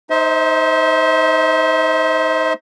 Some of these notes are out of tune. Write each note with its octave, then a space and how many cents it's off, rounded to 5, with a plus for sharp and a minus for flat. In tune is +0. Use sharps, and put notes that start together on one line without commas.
D#4 +0 C5 +0 E5 -45